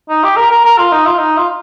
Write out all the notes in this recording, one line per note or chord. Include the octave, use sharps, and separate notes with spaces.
D#4
G4
A#4
A#4
A#4
F4
D#4
F4
D#4
F4